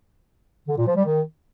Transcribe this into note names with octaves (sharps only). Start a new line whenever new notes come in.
D3
A#2
F3
G3
D#3